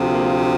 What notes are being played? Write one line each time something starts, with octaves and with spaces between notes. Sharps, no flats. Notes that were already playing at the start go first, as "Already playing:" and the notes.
Already playing: D2 C3 F3
A#3